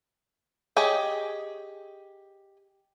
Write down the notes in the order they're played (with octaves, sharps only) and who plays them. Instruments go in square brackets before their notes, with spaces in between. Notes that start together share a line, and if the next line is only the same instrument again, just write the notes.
[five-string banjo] G4 G#4 C#5 D#5